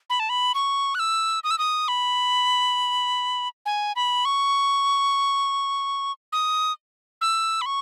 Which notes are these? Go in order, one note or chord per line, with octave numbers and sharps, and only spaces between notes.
B5
A5
B5
C#6
F#6
E6
D#6
E6
D#6
B5
G#5
B5
C#6
D#6
E6
B5
C#6